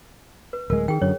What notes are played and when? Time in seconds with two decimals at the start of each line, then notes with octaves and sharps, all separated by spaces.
0.53 B4
0.70 D1 G#3 A#4
0.88 D#3 G#4 G5
1.02 F#2 D3 F#3 C#5